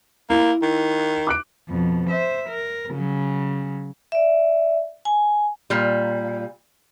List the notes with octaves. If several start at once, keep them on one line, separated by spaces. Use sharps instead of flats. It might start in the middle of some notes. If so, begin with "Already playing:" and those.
A#3 E4
D#3
D6 F#6 D7
F2 B2
C5 E5
A#4
C#3 F#3
D5 E5
G#5
A#2 G3